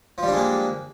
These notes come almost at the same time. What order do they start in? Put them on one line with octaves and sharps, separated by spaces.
F3 G3 D4 G#3 A#3